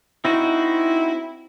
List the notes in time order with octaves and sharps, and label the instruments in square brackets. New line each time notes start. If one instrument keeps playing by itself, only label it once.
[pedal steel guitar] C4 D#4 F#4 [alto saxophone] E4